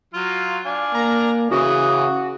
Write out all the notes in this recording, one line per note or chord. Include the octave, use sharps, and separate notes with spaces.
F#3 F4 F5
D4 F5 G#5
A#3 A#5
C#3 E3 F#4 D#6